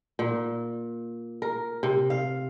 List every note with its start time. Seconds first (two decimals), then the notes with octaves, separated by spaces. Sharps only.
0.19 A#2
1.42 A#4
1.83 C3
2.10 F5